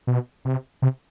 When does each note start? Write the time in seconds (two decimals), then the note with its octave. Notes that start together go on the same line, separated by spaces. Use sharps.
0.07 B2
0.45 C3
0.82 C3